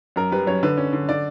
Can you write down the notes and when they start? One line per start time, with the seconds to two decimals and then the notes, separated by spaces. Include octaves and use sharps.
0.16 F#2 A#4
0.32 G3 B4
0.47 F#2 C#5
0.63 D3 B4
0.78 C#4
0.93 D3
1.09 D3 D5